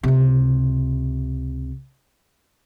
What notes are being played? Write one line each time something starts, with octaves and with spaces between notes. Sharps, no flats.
C#2 C3